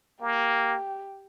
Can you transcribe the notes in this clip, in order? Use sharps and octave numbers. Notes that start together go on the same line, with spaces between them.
A#3 G4